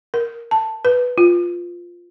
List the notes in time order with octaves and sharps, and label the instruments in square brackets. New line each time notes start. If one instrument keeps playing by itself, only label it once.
[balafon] A#4
A5
B4
F4